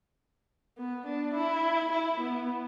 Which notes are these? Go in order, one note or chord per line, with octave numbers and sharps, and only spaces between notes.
B3
D4
E4
E4
B3